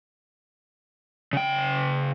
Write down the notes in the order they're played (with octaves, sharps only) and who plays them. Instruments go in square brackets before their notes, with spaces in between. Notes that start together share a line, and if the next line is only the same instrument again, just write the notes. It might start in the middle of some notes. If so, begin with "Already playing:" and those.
[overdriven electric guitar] C#3 G5